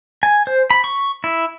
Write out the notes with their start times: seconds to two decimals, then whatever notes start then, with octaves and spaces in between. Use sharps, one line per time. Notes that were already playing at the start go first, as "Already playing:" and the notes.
0.23 G#5
0.47 C5
0.70 B5
0.84 C#6
1.24 E4